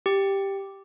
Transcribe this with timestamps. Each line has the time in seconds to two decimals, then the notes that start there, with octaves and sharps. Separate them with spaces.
0.06 G4